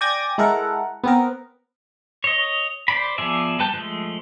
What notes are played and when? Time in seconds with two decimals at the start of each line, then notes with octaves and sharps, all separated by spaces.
0.01 D5 G5 G#5 G#6 A#6
0.38 G#3 E4 A4 A#4 F#5
1.04 B3 C4 A#4
2.24 C#5 D#5
2.88 C5 D5 B5
3.18 F3 B3 G#4 D5 E5
3.59 G3 B4 A5 G6
3.73 F3 G#3 A3